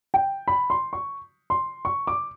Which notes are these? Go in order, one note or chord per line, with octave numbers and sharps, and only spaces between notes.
G5
B5
C6
C#6
C6
C#6
D6